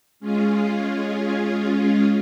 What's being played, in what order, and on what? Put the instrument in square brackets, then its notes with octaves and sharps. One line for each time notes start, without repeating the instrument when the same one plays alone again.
[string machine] G#3 C#4 F4 G#4